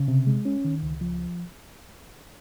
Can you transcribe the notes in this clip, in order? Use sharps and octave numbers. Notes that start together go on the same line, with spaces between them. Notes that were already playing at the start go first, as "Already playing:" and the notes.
Already playing: C#3
C3
G#3
C#4
D#3
C#2
F3